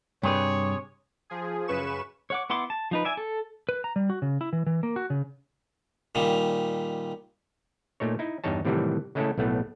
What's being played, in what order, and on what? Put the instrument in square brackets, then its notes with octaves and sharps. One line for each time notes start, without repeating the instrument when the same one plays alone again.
[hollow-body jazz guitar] G2 B4 [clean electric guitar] C3 G#4 [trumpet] C#5
[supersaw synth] F3 G#4
F#2 C#3 B4 C#6 E7
[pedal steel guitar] C#5 F#5 D6
B3 E4 F#5 C6 D6
A5
F3 D#4 B4
D5 E5 G#5
A4
[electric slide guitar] B4
A#5
G3
F#4
C#3
E4
E3
E3
A#3
F#4
C#3
[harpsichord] A#2 D#3 G3
[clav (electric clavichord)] A#2 A3 D#4 C#5
D#4 E4
E2 G2 D#4 C#5 A5
A2 C3 D#3 E3 F#3 G3
C#3 G#3 A3 C#4 E4 A4
B1 A2 A3 B3